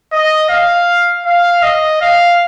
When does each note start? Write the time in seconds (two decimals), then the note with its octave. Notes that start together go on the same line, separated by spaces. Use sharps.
0.12 D#5
0.49 F5
1.26 F5
1.62 D#5
2.01 F5